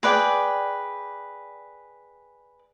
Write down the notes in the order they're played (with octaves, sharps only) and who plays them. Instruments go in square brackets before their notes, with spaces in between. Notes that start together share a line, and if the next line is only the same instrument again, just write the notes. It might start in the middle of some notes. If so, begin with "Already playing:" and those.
[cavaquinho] G#4 B4 D5 G5